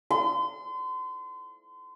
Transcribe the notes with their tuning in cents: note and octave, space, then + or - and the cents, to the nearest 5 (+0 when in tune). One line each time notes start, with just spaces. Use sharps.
C6 -35